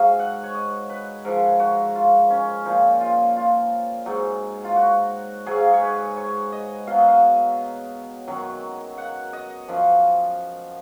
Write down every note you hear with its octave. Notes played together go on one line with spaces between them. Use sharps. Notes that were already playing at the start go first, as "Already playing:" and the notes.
Already playing: G#2 F#3 D#5 F5
F#5
C#5
D#5
B4
G#2 F3 A#4
F#4
F4
C#4
A#2 F3 D#4
F4
F4
G#2 F#3 D#4
F4
F#4
G#2 F#3 G#4
F5
D#5
C#5
B4
C#5
D#5
B2 F#3 F5
D#5
F5
F#2 D#3 F#3
F#5
D#5
F#2 F3 D#5